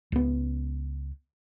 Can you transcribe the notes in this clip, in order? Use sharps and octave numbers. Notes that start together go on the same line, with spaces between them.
C#2 B3